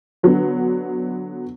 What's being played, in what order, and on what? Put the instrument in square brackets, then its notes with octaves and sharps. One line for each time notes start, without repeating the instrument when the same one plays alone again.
[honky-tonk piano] D3 F#3 B3